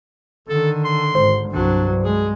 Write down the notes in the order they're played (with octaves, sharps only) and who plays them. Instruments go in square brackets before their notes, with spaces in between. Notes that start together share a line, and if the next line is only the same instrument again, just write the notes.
[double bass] D3 D#3 [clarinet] A4
[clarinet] C6
[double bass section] G#1 [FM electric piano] C5
[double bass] C2 F#3 [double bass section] G2 [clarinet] D4
[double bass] G#3 [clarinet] G#4